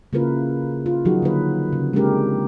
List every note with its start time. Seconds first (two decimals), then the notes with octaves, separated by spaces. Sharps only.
0.13 C#3 A#3 E4 F4 A#4 B4
0.86 F4
1.05 D#3 F3 F#3 D#4 F#4 G#4
1.22 D3 A#3 B4
1.73 C#3
1.93 G#3 A#3 C4 D4 G4 A#4